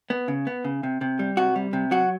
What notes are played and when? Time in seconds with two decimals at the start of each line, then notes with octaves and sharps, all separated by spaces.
0.10 B3
0.28 C#3
0.47 B3
0.64 C#3
0.83 C3
1.01 C3
1.19 G3
1.37 C3 F#4
1.56 G3
1.73 C3
1.91 F#3 F#4